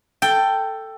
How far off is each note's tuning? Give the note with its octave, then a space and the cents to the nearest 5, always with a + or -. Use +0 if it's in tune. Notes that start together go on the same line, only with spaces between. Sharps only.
A4 +10 G5 +0